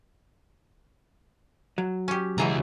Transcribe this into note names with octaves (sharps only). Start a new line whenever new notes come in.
F#3
C#4 G4
C#2 B2 E3 G#4 A#5